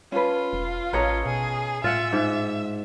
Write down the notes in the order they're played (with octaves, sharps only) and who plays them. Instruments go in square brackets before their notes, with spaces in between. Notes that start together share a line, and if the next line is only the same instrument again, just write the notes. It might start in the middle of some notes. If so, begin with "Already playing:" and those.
[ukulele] C#4 A4 B4 [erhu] F4
[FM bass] E1
[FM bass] A1 [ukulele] C#4 A4 A#5 [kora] B4 C#5 D#5
[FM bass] B2 [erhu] G#4
[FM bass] A2 [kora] F4 F#5 [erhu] E5
[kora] G#2